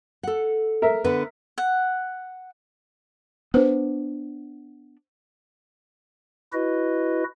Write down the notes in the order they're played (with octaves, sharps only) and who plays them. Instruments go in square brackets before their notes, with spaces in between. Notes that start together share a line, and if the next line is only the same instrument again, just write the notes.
[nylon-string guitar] A4 F#5
[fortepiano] A#4 E5
[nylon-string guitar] D3 B3 B4
[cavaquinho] F#5
[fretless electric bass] B3 D4 [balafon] B4 C5
[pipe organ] E4 F#4 B4 D#5